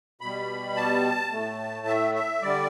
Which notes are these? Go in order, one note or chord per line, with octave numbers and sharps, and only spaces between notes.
B2 G3 B5
A5
A2 A3
E5
E5
D3 G3 D5